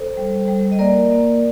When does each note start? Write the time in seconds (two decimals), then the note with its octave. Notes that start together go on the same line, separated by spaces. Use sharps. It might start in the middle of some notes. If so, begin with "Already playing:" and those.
Already playing: A4 C5
0.17 G3
0.48 G3
0.71 D#5
0.79 A#3 A#4 D5
1.10 A#3